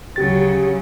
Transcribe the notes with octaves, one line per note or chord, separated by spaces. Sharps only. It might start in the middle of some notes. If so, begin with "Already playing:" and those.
D2 C#3 F#3 G4 A6